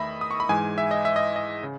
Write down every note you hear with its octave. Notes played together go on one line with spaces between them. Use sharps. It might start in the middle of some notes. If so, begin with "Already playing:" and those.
Already playing: E2 D#3 A3 D#5 E5 B5
D#6
C#6
B5
G#2 E3 G#3 G#5
E5
D#5
E5
D#5
D#5
C#3